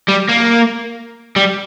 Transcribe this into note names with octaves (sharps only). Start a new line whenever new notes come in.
G3
A#3
G3